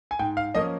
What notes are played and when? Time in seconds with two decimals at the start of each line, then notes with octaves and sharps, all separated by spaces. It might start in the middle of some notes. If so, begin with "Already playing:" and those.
0.11 G#5
0.19 G#2 G5
0.37 F5
0.55 F3 A#3 C#4 D#5